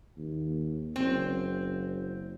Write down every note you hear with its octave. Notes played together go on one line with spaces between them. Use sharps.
D#2
F#1 C4